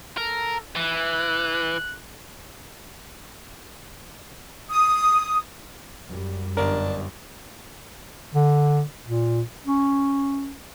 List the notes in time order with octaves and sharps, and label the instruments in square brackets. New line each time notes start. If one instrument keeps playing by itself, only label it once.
[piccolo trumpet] A4 [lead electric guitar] A#4
[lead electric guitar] E3 [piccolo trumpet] F#6
[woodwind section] D#6
[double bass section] F#2 G3
[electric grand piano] G1 A#4 [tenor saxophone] D4
[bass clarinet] D3
A#2
C#4